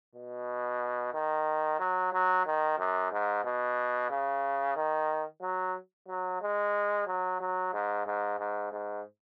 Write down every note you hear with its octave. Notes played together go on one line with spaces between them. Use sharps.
B2
D#3
F#3
F#3
D#3
F#2
G#2
B2
C#3
D#3
F#3
F#3
G#3
F#3
F#3
G#2
G#2
G#2
G#2